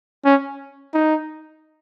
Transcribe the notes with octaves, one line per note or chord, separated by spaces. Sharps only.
C#4
D#4